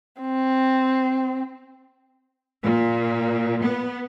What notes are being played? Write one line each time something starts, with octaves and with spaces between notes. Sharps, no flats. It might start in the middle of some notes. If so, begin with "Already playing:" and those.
C4
A#2
B3